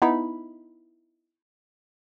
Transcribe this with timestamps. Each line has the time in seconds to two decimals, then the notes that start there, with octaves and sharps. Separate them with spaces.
0.02 B3 D#4 E4 B5